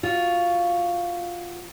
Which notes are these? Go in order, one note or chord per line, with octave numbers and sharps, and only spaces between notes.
F4 F#4